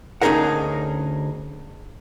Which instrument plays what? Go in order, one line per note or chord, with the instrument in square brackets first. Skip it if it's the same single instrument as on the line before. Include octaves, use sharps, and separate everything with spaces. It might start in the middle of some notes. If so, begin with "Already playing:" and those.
[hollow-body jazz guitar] D2 C#4 D#4 G#4 A#4 F#5